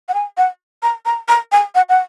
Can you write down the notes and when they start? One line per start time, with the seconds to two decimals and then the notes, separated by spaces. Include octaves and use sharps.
0.09 F#5
0.14 G#5
0.37 F#5
0.83 A#5
1.06 A#5
1.28 A#5
1.52 G#5
1.75 F#5
1.89 F#5